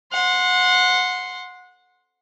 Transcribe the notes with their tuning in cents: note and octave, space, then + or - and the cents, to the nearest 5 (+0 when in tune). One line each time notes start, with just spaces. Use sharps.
F#5 -25 C6 +0